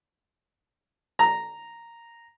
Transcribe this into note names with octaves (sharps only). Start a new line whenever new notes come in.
A#5